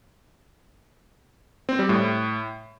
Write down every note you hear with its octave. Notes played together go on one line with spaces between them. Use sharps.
C4
G3
A2